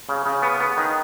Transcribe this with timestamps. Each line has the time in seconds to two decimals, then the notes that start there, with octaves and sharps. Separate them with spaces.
0.09 C#3
0.26 C#3
0.42 B3
0.60 B3
0.77 D#3